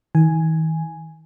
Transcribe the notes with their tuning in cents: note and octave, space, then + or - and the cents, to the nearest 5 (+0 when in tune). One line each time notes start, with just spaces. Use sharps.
D#3 +45 G#5 +0